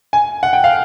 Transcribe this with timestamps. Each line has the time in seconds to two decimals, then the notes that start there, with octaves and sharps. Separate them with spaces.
0.13 G#5
0.43 F#5
0.53 G5
0.64 F5